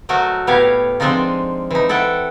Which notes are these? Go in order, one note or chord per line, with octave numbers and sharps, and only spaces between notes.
F#3 A3 F#4 A#4 D#5
A2 B3 G4 C#5 F5
F3 G#3 C4 D4 D#4 F4
E3 D#4
E4 A4 E5 F#5 G5